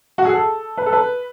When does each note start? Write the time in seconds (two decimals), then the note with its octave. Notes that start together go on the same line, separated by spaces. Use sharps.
0.18 F#4
0.25 G#4
0.33 A4
0.77 B4
0.86 A4
0.93 B4